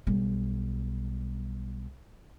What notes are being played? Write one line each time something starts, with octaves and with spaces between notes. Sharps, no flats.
B1 G3